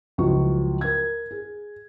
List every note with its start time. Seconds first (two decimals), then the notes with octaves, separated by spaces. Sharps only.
0.18 C#2 F3 F#3 E4 C#6
0.81 A#4 G#6
1.31 G#4